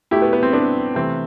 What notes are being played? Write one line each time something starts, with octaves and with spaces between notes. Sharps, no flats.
B2 A3 E4 G4
B3
B3
C4
B3 D4
C3 E3 A3 C4